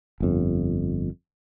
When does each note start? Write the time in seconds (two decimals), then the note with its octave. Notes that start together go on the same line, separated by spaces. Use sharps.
0.20 G1 F2